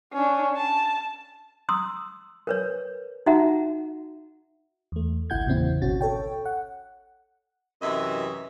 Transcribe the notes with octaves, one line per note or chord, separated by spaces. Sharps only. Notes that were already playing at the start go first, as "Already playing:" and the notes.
C#4 D4
A5
A#5 C6 D#6 E6
A#4 B4 C#5
D#4 F#4 E5 F#5 A#5
E2 A3
G#1 C#2 E4 F#5 G6 G#6
E2 A#2 C#3 C4 E4
G#1 C#2 B2 C#4 F#4 A6
A4 C#5 G5
F#5
F#2 C3 E3 D#5 E5